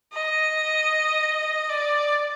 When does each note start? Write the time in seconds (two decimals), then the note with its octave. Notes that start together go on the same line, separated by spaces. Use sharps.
0.13 D#5
1.69 D5